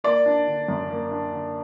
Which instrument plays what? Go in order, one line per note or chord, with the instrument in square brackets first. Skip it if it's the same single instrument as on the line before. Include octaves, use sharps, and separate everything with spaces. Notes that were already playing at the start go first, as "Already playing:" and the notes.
[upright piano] A#3 D5
D4
D3
F#2
A#3
D4
D3